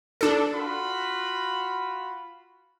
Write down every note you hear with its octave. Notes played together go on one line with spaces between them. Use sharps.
D4 A4
F4 F#4 B5